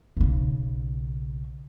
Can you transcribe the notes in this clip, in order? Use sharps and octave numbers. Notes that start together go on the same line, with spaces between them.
B1 C#3